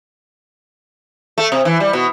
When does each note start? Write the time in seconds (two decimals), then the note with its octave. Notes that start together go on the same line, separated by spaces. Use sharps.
1.38 A3
1.52 C3
1.65 E3
1.80 G3
1.93 B2